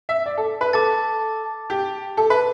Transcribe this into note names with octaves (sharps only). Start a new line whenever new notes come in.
E5
D5
A4
B4
A4 A5 D6 A6
G4
A4
B4